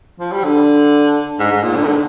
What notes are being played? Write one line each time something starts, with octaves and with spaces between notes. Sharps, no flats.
F3
G3
D3
G#2
G#2
A#2
D3
D#3
D3